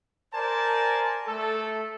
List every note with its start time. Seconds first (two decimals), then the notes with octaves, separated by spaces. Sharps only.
0.34 A#4 C5 D5 G#5 A5
1.27 A3 A4